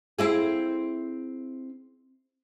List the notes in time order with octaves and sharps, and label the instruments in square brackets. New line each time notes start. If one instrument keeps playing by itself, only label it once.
[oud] C4 E4 G#4